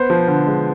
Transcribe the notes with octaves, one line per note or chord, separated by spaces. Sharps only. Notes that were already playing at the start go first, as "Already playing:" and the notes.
Already playing: B3 C5
F3
D3
G#3